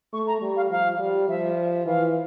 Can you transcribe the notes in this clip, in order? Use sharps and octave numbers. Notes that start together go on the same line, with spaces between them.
A3 C#6
A#5
G3
F5
F3 F5
G3
F3 E5
E3 F5